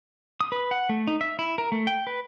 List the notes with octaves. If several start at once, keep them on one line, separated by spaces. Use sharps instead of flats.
D#6
B4
F#5
A3
D#4
E5
E4
A#4
A3
G5
B4